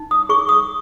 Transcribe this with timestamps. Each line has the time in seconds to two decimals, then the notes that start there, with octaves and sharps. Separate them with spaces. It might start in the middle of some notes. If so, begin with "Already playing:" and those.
Already playing: D#4
0.11 D#6
0.29 G#4 C#6
0.49 D#6